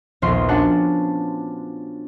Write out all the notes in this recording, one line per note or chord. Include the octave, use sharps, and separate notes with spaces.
A#1 D#2 B3 F4 C6
C#4 D4 F4 F#4 F#5 A5